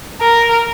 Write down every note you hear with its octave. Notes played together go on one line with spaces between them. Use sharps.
A#4